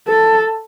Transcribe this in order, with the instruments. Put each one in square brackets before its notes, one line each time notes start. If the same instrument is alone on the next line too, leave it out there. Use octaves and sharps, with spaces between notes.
[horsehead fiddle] A4